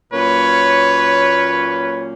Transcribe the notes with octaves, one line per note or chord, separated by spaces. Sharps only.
A#2 F#3 A#3 C#4 B4 C#5